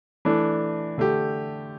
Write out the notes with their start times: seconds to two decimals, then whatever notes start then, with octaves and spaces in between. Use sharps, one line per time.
0.25 E3 A3 D4
0.98 D3 A3 G4